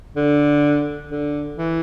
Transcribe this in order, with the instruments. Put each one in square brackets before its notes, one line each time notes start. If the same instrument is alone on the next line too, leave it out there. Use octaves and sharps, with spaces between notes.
[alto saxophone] D3
D3
E3